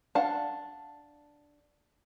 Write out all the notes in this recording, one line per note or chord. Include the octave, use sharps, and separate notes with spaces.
D4 F5 F#5 A5